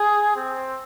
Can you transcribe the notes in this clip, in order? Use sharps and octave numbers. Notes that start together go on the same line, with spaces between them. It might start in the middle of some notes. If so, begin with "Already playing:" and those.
Already playing: G#4
C4